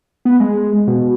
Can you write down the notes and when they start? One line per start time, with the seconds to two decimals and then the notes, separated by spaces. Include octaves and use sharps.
0.25 B3
0.40 G#3
0.87 B2